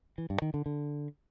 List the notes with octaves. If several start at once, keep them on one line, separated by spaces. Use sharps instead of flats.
E3
G2
D#3
D3
D3